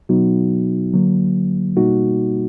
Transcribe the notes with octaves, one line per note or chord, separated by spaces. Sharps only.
B2 F#3 B3 D#4 F#4
D3 F#3 A#3
B2 G3 A#3 D#4 F#4